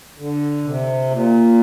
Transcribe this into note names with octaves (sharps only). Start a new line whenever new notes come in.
D3
C3
A#2